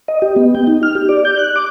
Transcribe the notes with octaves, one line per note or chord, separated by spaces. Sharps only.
D#5
G4
B3
G5
D#4
F6
G4
D5
G6
F#6
D6